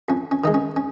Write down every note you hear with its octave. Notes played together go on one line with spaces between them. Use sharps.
F2 C#4
C#4
D#3 G#3 D#4
C#4
C#4